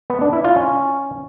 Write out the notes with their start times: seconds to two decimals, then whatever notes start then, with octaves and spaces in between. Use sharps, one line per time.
0.10 B3
0.21 D4
0.33 E4
0.44 F4
0.56 C#4